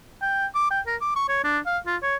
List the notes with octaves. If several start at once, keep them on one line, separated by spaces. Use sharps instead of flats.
G5
D6
G5
A#4
D6
C#6
C#5
D4
F5
F4
C#5